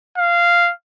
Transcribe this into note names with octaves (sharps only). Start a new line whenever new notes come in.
F5